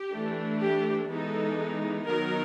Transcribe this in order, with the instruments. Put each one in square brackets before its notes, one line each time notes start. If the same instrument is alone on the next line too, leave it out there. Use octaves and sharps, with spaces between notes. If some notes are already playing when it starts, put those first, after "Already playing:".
Already playing: [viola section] G4
E3 A3 D4
G4
E3 G#3 B3 D#4 A4
D#3 F#3 B3 D#4 A#4